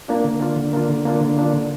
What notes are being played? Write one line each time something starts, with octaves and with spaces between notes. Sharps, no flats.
A#3 D4 F4
D3
A#3 D4 F4
D3
A#3 D4 F4
D3
A#3 D4 F4
D3
A#3 D4 F4
D3